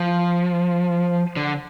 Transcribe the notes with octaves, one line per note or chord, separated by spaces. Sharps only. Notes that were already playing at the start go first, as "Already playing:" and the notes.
Already playing: F3
D3